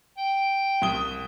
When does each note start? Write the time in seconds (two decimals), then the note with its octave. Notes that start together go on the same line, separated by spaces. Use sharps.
0.18 G5
0.82 C2 D#6 G7